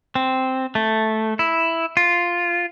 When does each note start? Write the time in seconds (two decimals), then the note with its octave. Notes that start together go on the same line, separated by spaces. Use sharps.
0.15 C4
0.75 A3
1.39 E4
1.97 F4